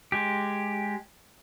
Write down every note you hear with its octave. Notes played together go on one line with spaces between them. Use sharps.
G#3 G4